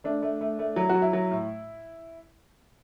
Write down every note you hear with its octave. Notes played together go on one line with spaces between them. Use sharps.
A3 D4
A3
A3
A3
F#3 E4
F#3 F#4
E4
F#3
A2